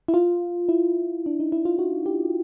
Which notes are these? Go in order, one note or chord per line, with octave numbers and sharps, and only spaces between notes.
E4
F4
E4
D4
D#4
E4
F4
F#4
G4